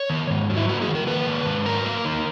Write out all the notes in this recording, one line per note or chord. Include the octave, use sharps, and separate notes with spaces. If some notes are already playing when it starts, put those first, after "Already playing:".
Already playing: C#5
D#3
G#2
F#3
E4
A#3 F#4
G#4
D#3
A#4
A#3 B4
D#3
G#2
F#3 A#4
A#3
D#3